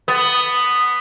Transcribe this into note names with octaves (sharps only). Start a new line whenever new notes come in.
B3